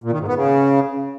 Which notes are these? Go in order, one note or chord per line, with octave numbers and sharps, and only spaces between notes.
A#2
D#3
G#2
B3
C#3